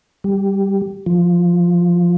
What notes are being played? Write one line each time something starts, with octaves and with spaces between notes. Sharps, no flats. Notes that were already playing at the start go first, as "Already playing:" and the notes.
G3
F3